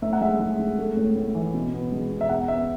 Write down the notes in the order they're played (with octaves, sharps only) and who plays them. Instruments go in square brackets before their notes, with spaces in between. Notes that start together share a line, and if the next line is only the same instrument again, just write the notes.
[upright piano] A2 E5
F#5
G#3 E5
G#3
G#3
A3
A2
A2
E3
B2
B3
G#3
B2
E5
E2 F#5
B3 E5